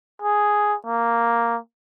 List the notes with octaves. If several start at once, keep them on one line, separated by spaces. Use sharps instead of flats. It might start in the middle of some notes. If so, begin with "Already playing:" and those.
G#4
A#3